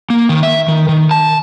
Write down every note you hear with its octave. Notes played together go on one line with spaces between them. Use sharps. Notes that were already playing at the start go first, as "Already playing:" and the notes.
A#3
D#3
E5
D#3
D#3
A5